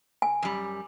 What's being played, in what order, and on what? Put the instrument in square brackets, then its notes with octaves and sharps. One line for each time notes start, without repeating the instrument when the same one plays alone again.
[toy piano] G#5
[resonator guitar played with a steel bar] F#2 G3